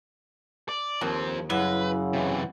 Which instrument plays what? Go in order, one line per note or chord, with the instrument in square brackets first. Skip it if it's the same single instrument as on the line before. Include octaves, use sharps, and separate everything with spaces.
[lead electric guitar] D5
[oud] D#2 [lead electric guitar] F3 C4
[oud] F#2 [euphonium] C#3 [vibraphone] E4 F#5 [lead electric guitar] B4
[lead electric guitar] C3 E3